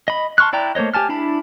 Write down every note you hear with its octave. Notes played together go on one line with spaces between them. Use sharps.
D#5 B5
A5 C6 C#6 F6 F#6
E4 D5 G5 A#5
A3 A#3 C5 C#5 D#5
G4 G#5 A5 F6
D4 E4 A5 B5